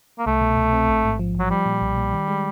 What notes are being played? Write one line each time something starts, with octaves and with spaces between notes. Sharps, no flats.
A#3
C2 A3
B2
C2
C4
A1
G#2
F3
A1 F#3
F3 G3
A#2
B1
A#2
D#3
G#3